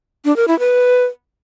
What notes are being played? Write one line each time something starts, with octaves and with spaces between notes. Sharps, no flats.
D4
A#4
E4
B4